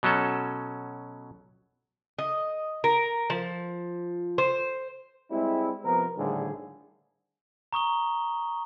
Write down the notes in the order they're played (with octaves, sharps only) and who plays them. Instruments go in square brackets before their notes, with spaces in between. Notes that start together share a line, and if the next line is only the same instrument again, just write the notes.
[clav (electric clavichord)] B2 F#3 C#4 A4
[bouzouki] D#5
A#4
F3
C5
[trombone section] G3 G#3 C4 E4
C3 F3 B3 A#4
A#1 A2 D3 D#3 G3 G#4
[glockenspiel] A#5 C#6 D#6 G7